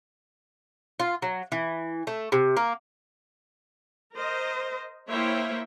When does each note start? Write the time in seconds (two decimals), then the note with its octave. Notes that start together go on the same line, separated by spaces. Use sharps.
1.00 F4
1.22 F#3
1.52 E3
2.07 A3
2.32 C3
2.57 A#3
4.14 A#4 C5 D#5
5.09 A#3 E4 C5 C#5 E5 G5